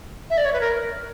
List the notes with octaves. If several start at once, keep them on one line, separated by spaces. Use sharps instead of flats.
E5
D5
C#5
B4
A#4